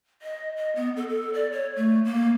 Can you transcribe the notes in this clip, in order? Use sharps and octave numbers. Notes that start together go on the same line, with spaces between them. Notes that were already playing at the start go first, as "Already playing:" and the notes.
D#5
D#5
B3
A4
A4
D5
C#5
A3
A#3